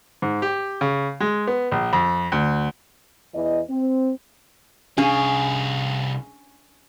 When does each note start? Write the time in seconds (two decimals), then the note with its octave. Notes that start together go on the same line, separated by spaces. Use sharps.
0.22 G#2
0.42 G4
0.81 C#3
1.20 G#3
1.47 B3
1.71 A#1
1.93 F2
2.32 D2
3.35 E2 E3 E4 D#5
3.70 C4
4.98 C2 C#4 D4 G#4 F5